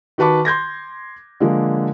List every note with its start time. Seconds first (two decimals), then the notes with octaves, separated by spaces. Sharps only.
0.18 D#3 F#4 B4 A5 C#6 D6
0.45 C6 G6 G#6 A#6
1.40 D3 F3 G#3 A#3